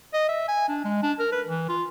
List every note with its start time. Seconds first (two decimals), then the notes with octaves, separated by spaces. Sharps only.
0.14 D#5
0.29 E5
0.48 G#5
0.69 D4
0.84 G#3
1.03 D4
1.19 A#4
1.32 B4
1.47 E3
1.69 F4